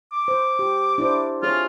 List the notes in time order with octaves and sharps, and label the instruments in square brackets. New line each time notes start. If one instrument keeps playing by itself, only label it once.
[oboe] D6
[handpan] C5
G4
D4 E4 C5
[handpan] C4 G#4 C#5 [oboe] F4